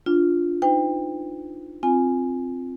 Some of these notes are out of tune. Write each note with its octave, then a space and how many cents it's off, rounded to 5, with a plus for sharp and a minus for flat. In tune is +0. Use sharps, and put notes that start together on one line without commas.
D4 -10 F4 +0
D#4 -15 C5 -45 G5 +25
C4 +0 F4 +0 G#5 +0